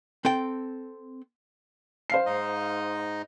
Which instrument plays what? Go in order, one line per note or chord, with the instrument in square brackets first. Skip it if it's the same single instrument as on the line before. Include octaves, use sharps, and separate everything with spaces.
[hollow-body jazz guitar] C4 A4 G5
[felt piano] C5 F5 C7
[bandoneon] G#2 D#4 D#5